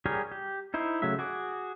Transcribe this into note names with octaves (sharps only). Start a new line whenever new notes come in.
G3 G4 G#4 A#4 C#5
G4
D#4 E4 C5
C#3 F#3 A3 E5
F#4 G#4 D6